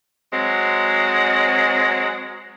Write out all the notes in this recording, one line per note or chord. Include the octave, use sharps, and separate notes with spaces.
F#3 G#3 C4 F#5